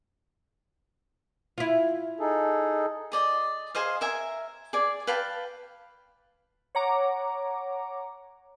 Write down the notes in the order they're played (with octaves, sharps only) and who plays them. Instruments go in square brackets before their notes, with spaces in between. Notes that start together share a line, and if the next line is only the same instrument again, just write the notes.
[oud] E4 F4
[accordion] D#4 G#4 A4
[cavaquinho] G#4 D5 D#5
G#4 C5 D#5 F5
A#4 E5 G#5
G#4 D5
B4 F5 G5 A5
[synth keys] C#5 F#5 A#5 D6